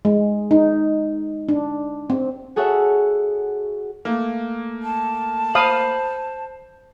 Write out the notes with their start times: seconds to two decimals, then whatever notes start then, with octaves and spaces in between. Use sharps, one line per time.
0.05 G#3
0.51 D#4
1.49 D4
2.10 C4
2.56 F#4 G#4 A4 C#5 E5 F#5
4.05 A3 A#3
4.83 A5
5.55 C5 F5 B5 D#6